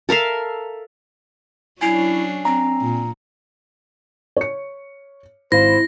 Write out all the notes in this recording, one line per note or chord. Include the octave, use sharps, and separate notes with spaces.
A4 A#4 E5 F5
F#3 C#4 D4 E4 G#5 C7 F7
C4 A#5
A#2
C#5 C#7
G#1 E4 C5 F5 A#6